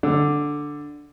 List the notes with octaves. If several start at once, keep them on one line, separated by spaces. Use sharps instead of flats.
D3